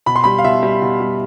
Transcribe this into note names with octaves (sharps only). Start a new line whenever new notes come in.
B2 B5
C6
G3 B5
F5
B2 E5
G3
B2
G3